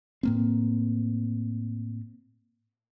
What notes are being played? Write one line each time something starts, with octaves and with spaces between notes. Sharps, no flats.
A2 A#3 C4